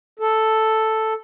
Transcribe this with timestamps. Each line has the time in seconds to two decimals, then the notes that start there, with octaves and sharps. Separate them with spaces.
0.19 A4